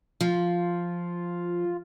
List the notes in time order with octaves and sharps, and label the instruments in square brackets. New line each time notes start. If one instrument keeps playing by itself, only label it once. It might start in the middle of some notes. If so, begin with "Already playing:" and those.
[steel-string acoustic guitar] F3 [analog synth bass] F4